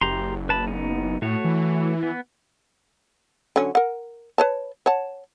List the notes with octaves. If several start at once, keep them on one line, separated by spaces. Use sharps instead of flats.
F#1 G4 A#5 C6
F#1 B4 A5 B5
B3 D#4
A2 A3 F#4 C#5
E3
B3
D3 F#3 C#4
A#4 F#5
B4 C#5 A5
C#5 F#5 A5